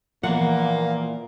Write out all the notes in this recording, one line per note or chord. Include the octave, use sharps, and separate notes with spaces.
A#2 E3 F3 A#3 B3 F#5